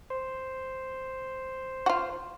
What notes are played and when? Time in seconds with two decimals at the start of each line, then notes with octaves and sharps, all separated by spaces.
0.10 C5
1.86 F4 F#4